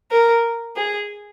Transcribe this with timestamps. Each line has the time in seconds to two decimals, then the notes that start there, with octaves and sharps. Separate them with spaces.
0.11 A#4
0.76 G#4